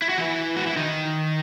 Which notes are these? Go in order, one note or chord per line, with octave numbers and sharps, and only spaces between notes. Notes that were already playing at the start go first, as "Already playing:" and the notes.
E4
F#4
E3 E4
F#4
E4
D#3 D#4